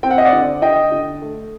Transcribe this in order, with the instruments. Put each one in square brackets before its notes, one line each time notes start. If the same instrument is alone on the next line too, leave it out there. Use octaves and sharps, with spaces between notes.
[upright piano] C4 G5
F#5
D#5
D5 F#5
D3
D3 D#5 G5
D3
A3